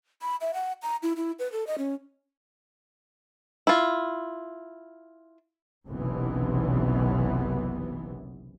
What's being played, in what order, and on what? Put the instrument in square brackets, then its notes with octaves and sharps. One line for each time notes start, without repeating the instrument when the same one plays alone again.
[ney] B5
E5
F#5
A#5
E4
E4
B4
A4
D#5
C#4
[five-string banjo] E4 F4
[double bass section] F#1 B1 F#2 C3 E3 B3